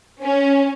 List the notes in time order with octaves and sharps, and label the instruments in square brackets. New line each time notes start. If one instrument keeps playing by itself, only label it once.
[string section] C#4